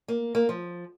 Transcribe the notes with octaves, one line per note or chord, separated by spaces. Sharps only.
A#3
A#3
F3